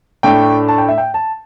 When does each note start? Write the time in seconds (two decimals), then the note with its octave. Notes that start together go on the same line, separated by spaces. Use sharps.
0.23 A2 A3 D4 G5
0.68 A5
0.78 G5
0.89 E5
0.98 G5
1.14 A5